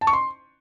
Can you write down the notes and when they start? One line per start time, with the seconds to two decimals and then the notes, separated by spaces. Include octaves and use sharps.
0.01 A5
0.07 C#6
0.13 C6